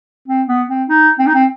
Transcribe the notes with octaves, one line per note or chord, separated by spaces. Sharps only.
C4
B3
C4
D#4
C4
D#4
C4